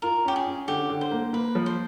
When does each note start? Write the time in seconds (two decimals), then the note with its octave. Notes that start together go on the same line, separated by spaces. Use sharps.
0.02 F4 A#4
0.25 C#4 G4
0.36 G#4
0.47 C#4
0.68 D3 G4
0.89 D3
1.01 C5
1.12 A#3
1.33 A#3 B4
1.55 F3
1.66 C5